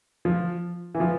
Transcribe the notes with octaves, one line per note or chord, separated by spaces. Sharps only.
F3
E3
F3